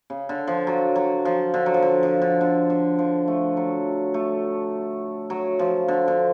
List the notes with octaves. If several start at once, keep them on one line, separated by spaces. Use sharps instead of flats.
C#3
D3
F3
F#3
F#3
F3
D3
F#3
F3
D3
F3
D3
D3
D3
F3
A3
F#3
A3
F#3
F3
D3
D3